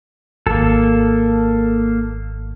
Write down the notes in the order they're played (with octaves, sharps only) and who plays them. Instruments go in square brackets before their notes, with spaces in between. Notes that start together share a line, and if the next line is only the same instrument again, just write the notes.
[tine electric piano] G#1 [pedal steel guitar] A#3 A4